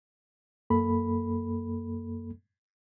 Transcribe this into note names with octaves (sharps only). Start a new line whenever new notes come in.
F#2 A#3 A4 B5